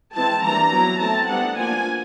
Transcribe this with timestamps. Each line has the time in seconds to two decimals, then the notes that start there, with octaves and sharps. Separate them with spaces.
0.15 E3 G#3 C4 A5
0.43 E3 G3 A#3 D4 A#5
0.72 F#3 B3 E4
1.00 A3 C4 E4 A5
1.28 G3 B3 D4 F#5
1.57 F3 A#3 D4 F4 G#5